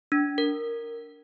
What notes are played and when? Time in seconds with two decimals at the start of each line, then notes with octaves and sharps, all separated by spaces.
0.12 D4
0.38 A#4